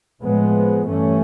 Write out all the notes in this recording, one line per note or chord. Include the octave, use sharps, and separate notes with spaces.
A2 F3 G#3 B3
G2 E3 A3 C#4